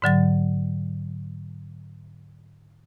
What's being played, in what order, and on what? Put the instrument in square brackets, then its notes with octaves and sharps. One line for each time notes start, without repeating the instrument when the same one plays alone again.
[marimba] G#2 D3 F#3 A6